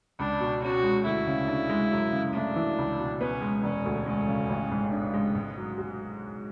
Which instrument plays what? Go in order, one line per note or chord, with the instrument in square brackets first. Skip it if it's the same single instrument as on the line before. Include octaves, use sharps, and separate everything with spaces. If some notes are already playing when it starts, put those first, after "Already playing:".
[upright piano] C#2 [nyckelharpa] D4
[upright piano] B2
[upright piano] C#4 [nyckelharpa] F#4
[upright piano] G#3
[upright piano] D2 [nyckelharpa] E4
[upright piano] C#3
D4
G#3
F#2
C#3
[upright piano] A3 [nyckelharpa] D4
[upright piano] E3
C#2
B2
[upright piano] B3 [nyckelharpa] C#4
[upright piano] G#3
[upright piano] E1 [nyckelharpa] C#4
[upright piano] D2
[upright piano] G#3 [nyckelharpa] C#4
[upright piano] C#3
A1
G#2
[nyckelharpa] B3 [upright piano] D4
[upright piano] G#3
G#2
F#3
F#4